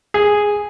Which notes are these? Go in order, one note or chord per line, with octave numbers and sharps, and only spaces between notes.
G#4